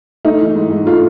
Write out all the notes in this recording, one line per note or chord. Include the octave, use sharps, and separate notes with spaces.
A3 D#4
E3
G#2
G#2
A3 F4